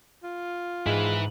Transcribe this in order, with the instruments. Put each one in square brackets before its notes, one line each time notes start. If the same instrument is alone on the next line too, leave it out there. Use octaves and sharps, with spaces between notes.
[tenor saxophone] F4
[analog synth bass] G#2 [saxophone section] D#3 G#3 [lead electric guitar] E4 B4